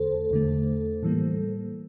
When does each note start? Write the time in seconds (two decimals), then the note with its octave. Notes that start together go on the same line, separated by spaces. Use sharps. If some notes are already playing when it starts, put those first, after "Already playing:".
Already playing: E2 D3 A3 A4 C5
0.31 E2 D3 A3
1.03 A2 E3 G3 A#3